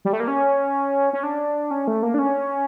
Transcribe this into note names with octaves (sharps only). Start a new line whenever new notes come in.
G3
A3
A#3
C#4
C#4
D4
C#4
A3
A#3
D4
C#4